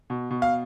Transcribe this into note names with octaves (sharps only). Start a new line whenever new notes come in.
B2
B2
F5